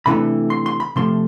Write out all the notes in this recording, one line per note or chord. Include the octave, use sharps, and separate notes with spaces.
C3 E3 A3 D4 B5
C6
C6
B5
C3 F3 A3 C6